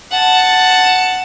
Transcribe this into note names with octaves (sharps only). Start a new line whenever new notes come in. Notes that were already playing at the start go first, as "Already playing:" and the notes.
F#5 A5